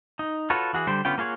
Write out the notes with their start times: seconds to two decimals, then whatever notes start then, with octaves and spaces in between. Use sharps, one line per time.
0.19 D#4
0.50 F4 F#4 A4 B4 C#5
0.73 E3 F#4 G#4
0.87 D3 G3 C5 G5
1.05 D3 B3 C#4 F4 G5
1.18 A#3 F4 G#4 C#5 F#5